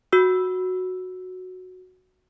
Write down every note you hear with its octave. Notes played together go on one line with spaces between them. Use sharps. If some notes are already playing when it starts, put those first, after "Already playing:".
F#4 E6